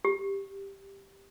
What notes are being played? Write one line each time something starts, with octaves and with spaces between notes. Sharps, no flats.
G4